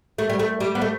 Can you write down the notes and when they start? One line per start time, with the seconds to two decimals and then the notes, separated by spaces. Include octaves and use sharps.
0.18 A3
0.30 G3
0.39 A3
0.60 G3
0.75 B3
0.82 A3